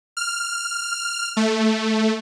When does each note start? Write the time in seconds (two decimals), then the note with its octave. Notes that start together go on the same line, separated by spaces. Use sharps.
0.17 F6
1.37 A3